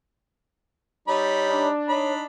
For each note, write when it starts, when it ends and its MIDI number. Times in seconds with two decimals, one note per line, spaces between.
1.08 1.70 55
1.08 1.70 63
1.08 1.68 73
1.08 1.70 83
1.48 2.26 62
1.89 2.24 63
1.89 2.13 73
1.89 2.24 83